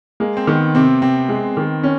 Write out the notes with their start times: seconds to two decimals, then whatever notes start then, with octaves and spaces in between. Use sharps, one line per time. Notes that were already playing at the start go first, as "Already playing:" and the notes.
0.20 G#3 A#3
0.37 C4
0.47 D#3 B3
0.75 C3 C4
1.02 C3 C4
1.29 G#3
1.57 D#3
1.83 C#4